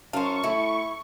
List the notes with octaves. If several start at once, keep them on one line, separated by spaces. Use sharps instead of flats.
F#2 C5 F5 A5 C#6
A2 E4